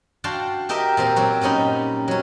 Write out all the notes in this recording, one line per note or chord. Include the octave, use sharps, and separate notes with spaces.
D4 F#4 F5 G5 A5 C6
G4 A#4 D#5 E5 G5
A#2 C4 A#4
F#3 C4 F#4
A#2 G3 C#4 D#4 B5
F#3 C#4